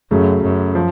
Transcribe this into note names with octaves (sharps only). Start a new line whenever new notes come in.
F#2 C#3 F#3 A3
F#2
F3